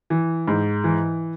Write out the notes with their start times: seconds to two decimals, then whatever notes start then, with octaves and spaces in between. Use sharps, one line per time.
0.10 E3
0.48 G#2
0.84 E3